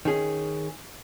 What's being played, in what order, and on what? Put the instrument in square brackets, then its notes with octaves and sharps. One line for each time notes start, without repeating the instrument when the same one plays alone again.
[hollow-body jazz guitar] D#3 C#4 G#4